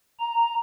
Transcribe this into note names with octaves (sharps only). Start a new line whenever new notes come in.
A#5